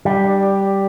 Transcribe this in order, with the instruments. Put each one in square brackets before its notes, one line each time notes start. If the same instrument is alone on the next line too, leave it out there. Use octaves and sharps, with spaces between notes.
[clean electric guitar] G3 [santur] D4
[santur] D4
G4
D5